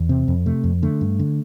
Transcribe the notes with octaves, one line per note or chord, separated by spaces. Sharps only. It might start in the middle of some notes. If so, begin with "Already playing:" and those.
Already playing: E2
C3 C4
F2
C3 A3
F2
D3 A3
G2
D3